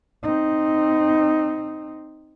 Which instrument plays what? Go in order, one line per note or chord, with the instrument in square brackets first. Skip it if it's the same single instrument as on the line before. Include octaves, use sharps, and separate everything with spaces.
[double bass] C4 D#4